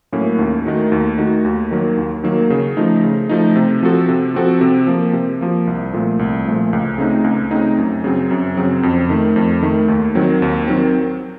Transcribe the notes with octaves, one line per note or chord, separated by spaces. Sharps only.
A2 F#3 A#3 C#4
D#2
D#3 A3 D#4 F#4
D#2
D#3 A3 D#4 F#4
D#2
D#3 F#3 A#3
D#2
D#3 F#3 A#3
C#3
F3 A3 D#4
C#3
F3 A3 D#4
C3
F3 C4 F#4 A4
C3
F3 C4 F#4 A4
C3
F3 A#3
C3
F3 A#3
C2
A#2 F3 A3
C2
A#2 F3 A3
C#2
C#3 A3 C4 D#4
C#2
C#3 A3 C4 D#4
F#2
C#3 F#3 C4
F#2
C#3 F#3 C4
F2
D#3 A3
F2
D#3 A3
D#2
D#3 F#3 C4
D#2
D#3 F#3 C4